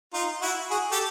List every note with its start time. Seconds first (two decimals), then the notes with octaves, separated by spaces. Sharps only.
0.14 D#4 F4
0.42 E4 F#4
0.71 F#4 G#4
0.92 G4 A4